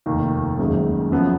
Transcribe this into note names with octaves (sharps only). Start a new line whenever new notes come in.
F1 D#2 D#3 A#3
F#1 F#2 D#3 G#3
F#2 C#3 F3 B3